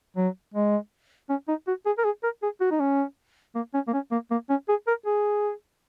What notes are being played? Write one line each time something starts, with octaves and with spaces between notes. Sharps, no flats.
F#3
G#3
C#4
D#4
F#4
G#4
A#4
G#4
A#4
G#4
F#4
D#4
C#4
A#3
C#4
A#3
C#4
A#3
A#3
C#4
G#4
A#4
G#4